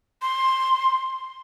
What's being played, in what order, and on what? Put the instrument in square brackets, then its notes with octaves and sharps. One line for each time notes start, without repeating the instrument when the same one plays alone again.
[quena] C6